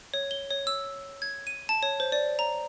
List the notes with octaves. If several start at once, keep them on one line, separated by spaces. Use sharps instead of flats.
C#5
G7
C#5
E6
G#6
D#7
A5
C#5
C5
D5
A#5